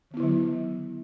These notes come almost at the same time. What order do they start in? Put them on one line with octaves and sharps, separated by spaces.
D#3 B3 E4 D3 F#3